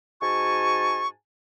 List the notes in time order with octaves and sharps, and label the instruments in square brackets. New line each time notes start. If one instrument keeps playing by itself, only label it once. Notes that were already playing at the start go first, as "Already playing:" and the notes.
[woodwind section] G#2 F#4 G#5 A5 C#6